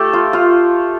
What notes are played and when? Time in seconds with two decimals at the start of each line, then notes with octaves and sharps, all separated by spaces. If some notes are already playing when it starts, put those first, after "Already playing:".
Already playing: A3 G4 A4
0.13 F4
0.33 F4